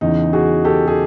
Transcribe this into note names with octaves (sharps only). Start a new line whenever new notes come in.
E2 C#3 E3 D#4
F#4 G#4
G4 A4
G#4